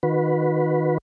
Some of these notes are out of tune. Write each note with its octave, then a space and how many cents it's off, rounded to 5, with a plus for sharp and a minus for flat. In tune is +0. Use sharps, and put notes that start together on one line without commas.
D#3 +0 F#4 -30 B4 +0